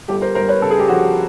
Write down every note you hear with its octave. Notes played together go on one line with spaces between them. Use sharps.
G1 G4 A4
A#4 C5
G1 A#4 C5
B4 C#5
C#3 A4
G#4
G4
F3 F#4 G#4